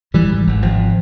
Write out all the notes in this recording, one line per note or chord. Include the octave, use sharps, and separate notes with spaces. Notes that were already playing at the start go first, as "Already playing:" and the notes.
G#1 E3 G3
G#2
G#1
G#1 F3